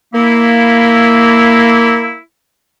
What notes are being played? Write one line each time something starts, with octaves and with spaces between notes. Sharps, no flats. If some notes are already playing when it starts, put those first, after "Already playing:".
A#3 E4